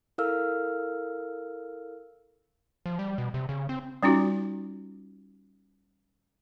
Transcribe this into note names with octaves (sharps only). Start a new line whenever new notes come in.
E4 A4 A#4 F5 E6 F6
F3
G3
B2
C3
C#3
C4
G3 C#4 D#4 F4 F#4